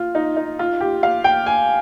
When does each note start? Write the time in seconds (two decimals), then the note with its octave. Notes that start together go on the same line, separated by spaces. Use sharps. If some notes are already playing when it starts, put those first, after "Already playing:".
Already playing: F4
0.15 D#4
0.37 D#4
0.59 F4
0.81 G4
1.03 F5
1.24 G5
1.46 G#5